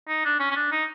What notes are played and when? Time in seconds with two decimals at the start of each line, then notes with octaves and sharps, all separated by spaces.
0.08 D#4
0.25 D4
0.40 C#4
0.51 C#4
0.56 D4
0.72 D#4